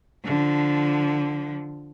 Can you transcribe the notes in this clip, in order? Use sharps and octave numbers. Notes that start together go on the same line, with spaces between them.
D3 F3